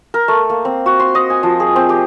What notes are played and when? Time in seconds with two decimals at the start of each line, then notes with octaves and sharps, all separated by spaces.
0.14 A#4
0.28 A3
0.50 A#3
0.65 C4
0.86 F#4
1.00 C6
1.15 D#5
1.30 G#5
1.43 F3
1.60 G#4
1.76 C4
1.89 G4